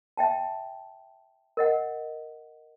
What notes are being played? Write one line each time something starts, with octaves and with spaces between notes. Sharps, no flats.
E5 G5 A5
A#4 D#5 F#5